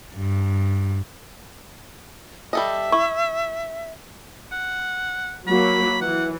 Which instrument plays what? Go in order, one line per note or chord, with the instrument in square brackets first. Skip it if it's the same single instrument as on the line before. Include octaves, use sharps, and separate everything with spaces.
[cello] G2
[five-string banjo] G3 A4 D#5 [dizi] E5
[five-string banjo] E4 [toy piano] C#6
[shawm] F#5
[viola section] F#3 A#3 [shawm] B5
[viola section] E3 [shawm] F#5